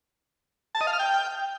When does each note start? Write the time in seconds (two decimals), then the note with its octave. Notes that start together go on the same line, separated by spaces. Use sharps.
0.75 A5
0.81 D#5
0.87 F5
0.93 F6
0.99 G5